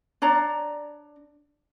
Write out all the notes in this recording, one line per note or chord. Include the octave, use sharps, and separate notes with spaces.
D4 C#5 D5 A#5